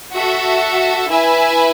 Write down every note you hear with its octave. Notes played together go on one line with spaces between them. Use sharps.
F#4 A4 E5
E4 B4 E5 G#5